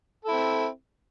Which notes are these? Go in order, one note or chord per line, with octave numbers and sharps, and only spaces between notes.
C4 E4 A4